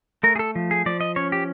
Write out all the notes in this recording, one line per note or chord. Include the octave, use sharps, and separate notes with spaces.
A3 A#4
G#4
A4
F3
G#4
F3 D5
D#5
C#4 C#5
G4